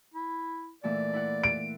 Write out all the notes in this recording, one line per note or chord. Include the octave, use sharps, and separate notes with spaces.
E4
A#2 E3 A3 D5
E4 F#5
D7